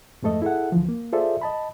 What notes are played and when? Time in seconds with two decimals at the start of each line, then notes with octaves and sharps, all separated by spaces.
0.22 F2 G#2 A3 A4 D#5
0.42 E4 G#4 A4 F#5
0.72 D2 E3 F3
0.89 A#3
1.12 F4 G#4 A4 C5 D5 E5
1.41 D#5 A5 B5